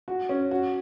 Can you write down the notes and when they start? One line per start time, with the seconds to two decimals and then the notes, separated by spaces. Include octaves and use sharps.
0.08 F#4
0.29 C#4
0.51 F#4